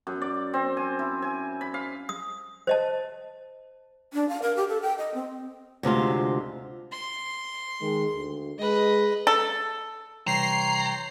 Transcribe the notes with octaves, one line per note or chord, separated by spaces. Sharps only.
F#2
D5
C4
G#5
E4
G#5
B5
F5
D#6
C5 D#5 A5
D4
F5
A#4
G4
A4
G5
D#5
C4
D2 C3 G#3 F4
C6
D#3 G#3
D2
G#3 B4 D#5
A4
C3 E3 G3 C#5 G5 A#5 C6 C7